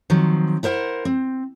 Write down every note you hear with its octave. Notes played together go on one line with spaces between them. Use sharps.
D#3 F3 F#3 C4
E4 A#4 C5 D5 F#5
C4